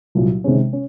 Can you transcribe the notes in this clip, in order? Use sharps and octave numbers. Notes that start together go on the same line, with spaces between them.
C2 A#2 F#3
C3 D#3 G#3 C#4
C#4